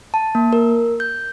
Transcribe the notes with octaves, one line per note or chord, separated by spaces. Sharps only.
A5
A#3
A#4
G6